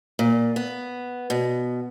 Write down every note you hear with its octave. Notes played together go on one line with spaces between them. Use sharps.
A#2
B3
B2